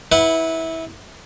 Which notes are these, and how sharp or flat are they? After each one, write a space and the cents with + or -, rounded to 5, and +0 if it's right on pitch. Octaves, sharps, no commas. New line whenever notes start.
E4 -20 B4 +0 F#5 +0